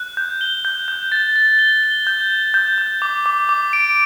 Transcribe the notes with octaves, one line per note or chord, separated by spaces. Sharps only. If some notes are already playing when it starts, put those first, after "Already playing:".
Already playing: F#6
G6
G7
G6
G6
A6
A6
G7
G7
G6
G7
G6
G6
D6
D6
D6
D7